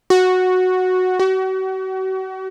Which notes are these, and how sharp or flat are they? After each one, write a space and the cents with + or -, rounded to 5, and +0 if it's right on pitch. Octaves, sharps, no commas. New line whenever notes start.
F#4 -5
F#4 +40